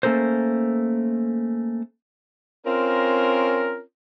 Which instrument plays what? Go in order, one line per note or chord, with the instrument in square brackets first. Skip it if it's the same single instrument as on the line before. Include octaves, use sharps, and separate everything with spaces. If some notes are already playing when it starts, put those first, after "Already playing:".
[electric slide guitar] A3 A#3 C#4 A4 A#4 C5
[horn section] C4 C#4 F4 A#4